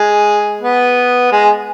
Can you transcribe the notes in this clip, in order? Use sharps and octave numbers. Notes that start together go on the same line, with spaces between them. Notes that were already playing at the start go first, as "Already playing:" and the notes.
Already playing: G#3 G#4
B3 B4
G#3 G#4